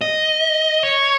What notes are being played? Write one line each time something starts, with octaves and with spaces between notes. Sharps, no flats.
D#5
C#5